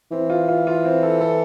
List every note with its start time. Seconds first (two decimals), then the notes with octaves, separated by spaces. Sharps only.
0.11 E3 C4
0.30 F4
0.49 F4
0.67 F4
0.85 C4
1.03 A4
1.21 A4